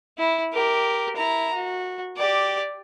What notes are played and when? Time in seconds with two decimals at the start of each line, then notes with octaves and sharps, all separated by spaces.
0.18 E4
0.53 G4 A#4
1.16 E4 A#5
1.54 F#4
2.16 G4 D5